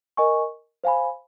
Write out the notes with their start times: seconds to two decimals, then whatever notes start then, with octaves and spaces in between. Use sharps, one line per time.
0.17 A#4 D#5 G#5 C#6
0.84 C5 F5 G#5 B5